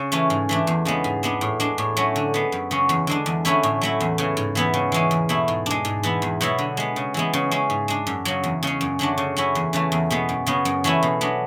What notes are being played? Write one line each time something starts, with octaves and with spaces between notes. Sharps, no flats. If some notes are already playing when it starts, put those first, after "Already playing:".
Already playing: C#3
E3 A3 C#4
G#2
E3 A3 D4
E2
C#3 G#3 B3
G#2
G#3 B3 D4
A2
G#3 D4
A2
F#3 A3 C#4
D3
G#3 B3
F#2
C#3 F#3 C#4
E2
D3 G#3 D4
E2
D3 A3 C#4 E4
A2
F#3 A3 E4
E2
C#3 E3
G#2
E3 B3 E4
C#3
E3 G#3 C#4
E2
B2 A3 E4
G#2
G#3 D4
G#2
E3 B3 E4
E2
B2 F#3 B3 E4
D3
G#3 B3
C#3
E3 G#3 B3
C#3
G#3 C#4
G#2
G#3 D4
F#2
C#3 F#3
E2
C#3 G#3 C#4
F#2
D3 F#3 A3 D4
C#3
F#3 C#4 E4
E2
C#3 E3 A3
E2
B2 G#3 B3
F#2
C#3 F#3 B3
F#2
E3 A3 C#4 E4
B2
F#3 B3 D4